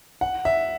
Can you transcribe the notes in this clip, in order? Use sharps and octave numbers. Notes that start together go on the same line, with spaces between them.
F#5
E5